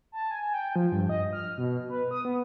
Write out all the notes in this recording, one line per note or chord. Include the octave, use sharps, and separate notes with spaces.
A5
G#5
G5
F3
G2
D#5
F6
B2
B4
D#6
B3